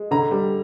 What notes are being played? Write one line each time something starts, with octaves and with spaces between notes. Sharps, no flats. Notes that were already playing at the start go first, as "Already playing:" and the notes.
Already playing: G#3
D3 A#5
G3